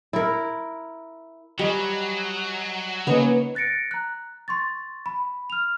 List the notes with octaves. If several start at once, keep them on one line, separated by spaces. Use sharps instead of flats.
E4 A#4
F#3 G3 D#5 G#5 C#6
C#3 A#3 B3 D#4 C#5 G#5
F#6 A6 A#6 C#7 D7
A#5 F#6
C6 C#6 A6
B5
F6 F7